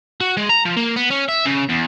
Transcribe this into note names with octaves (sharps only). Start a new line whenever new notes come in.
F#4
G#3
A#5
F3
A#3
B3
C#4
E5
C#3
E2